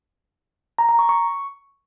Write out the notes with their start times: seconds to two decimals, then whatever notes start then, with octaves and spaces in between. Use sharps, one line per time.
0.79 A#5
0.89 A#5
0.99 C#6
1.09 C#6